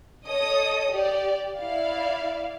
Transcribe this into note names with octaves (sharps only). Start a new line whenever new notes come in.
A4 C#5 D#5 D#6
G4 D5
E4 D5 F5